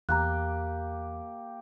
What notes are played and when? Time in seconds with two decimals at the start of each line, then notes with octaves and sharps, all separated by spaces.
0.09 E2 A#3 G4 A#5 F#6